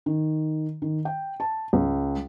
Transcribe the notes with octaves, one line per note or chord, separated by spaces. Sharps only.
D#3
D#3
G5
A5
C#2